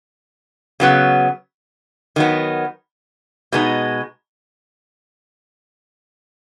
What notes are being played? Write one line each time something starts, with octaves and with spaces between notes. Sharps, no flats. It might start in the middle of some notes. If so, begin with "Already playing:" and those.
C#3 F#3 B3
D#3 F#3 B3
B2 G#3 B3 D#4